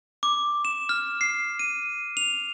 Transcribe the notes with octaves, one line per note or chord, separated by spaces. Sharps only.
D6
E7
F6
C7
D#7
F7